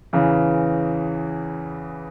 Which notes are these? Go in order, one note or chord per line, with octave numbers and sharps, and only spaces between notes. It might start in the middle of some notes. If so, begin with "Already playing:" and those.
E2 C#3 E3